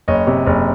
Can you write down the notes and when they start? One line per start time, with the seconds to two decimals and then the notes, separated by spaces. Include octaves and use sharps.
0.08 F#1 C#5 D#5
0.27 C3
0.47 F#1